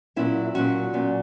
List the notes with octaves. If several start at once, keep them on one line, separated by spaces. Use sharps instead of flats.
A#2 F#3 C#4 E4
A#2 F#3 C#4 F#4
A#2 F#3 C#4